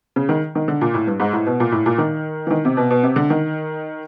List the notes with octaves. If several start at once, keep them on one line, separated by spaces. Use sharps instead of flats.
C#3
D#3
D#3
D3
A#2
A2
G2
G#2
A2
B2
A#2
A2
A#2
D#3
E3
D#3
C3
B2
B2
C3
D3
D#3